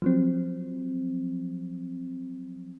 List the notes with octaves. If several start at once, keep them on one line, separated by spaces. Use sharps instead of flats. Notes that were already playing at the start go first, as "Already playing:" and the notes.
F3 F#3 C4